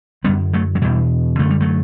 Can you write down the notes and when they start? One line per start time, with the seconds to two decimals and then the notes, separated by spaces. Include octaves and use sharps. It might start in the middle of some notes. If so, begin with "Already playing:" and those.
0.24 F#2 D3 G3 B3
0.53 F#3 A3
0.75 F#3
0.82 E2 B2 E3 G3
1.39 F#2 D3 A3
1.50 G3
1.61 F#3 A3